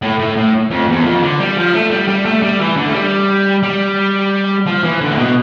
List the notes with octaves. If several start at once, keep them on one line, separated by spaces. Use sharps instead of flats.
A2
A2
A2
F2
E2
F2
D3
G3
F3
A3
G3
G3
A3
G3
E3
D3
A3
G3
G3
F3
E3
D3
A2
B2